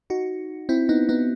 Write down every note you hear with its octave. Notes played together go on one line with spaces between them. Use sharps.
D#4 F#4
C4 E4
B3 D#4
B3 D#4